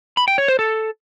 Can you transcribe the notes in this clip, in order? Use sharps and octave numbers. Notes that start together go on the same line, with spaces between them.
B5
G5
C#5
C5
A4